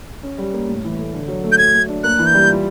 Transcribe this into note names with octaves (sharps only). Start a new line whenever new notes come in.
C#4
G3
A#3
A2
E3
A3
D3
F#3
A3
G6
F#3 G#6
A3
D4
A#3 F#6
E3
G6
G3
F4